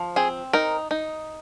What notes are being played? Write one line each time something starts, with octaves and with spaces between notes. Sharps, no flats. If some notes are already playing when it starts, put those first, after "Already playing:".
Already playing: F3
C4 G#4
D#4 A#4
D#4